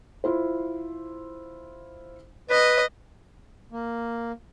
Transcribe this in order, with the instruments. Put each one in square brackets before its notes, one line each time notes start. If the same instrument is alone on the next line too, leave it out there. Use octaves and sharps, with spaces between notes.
[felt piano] E4 F4 C5
[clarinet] B4 [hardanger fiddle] D#5
[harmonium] A#3